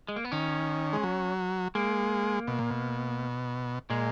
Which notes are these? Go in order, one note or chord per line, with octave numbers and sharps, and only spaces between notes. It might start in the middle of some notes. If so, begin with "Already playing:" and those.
G#3
A#3
B3
D#3 C#4
G#3
F#3
G#3 A#3
B2
A#2
B2
A#2 G#3